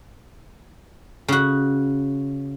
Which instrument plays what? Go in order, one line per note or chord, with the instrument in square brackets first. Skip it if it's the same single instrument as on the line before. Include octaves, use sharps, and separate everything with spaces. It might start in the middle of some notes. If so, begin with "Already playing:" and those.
[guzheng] C#3 F#4